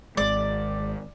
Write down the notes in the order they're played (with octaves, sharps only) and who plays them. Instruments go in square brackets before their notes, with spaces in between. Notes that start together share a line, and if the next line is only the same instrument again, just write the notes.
[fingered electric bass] G#1 G#3 [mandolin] D5